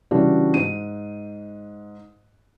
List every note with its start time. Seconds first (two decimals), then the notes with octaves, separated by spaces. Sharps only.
0.11 C#3 E3 G3 D4 F#4
0.54 G#2 D#7